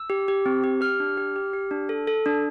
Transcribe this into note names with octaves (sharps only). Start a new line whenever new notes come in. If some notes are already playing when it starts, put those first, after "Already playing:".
Already playing: E6
G4
G4
C4
G4
G4 F6
D4
G4
G4
G4
D4
A4
A4
D4